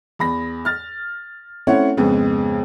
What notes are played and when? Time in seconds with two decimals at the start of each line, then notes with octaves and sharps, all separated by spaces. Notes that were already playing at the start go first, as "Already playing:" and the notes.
0.19 E2 B5 A#6
0.65 F6 A6
1.67 A3 C4 C#4 E4 C#5 F#5
1.97 F2 G#2 C#3 B3 C4